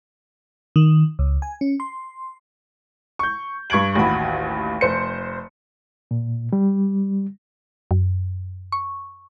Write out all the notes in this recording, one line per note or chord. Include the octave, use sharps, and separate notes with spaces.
D#3
C#2
G#5
C#4
C6
C#6 G6
G2 C#6 G#6 D7 F#7
A1 D#2 F#4 B5
F1 C5 C#7
A#2
G3
F#2
C#6